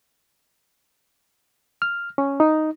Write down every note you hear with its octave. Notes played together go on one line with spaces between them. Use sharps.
F6
C#4
D#4